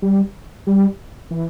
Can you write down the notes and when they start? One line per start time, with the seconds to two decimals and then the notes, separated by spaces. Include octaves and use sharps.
0.02 G3
0.67 G3
1.31 E3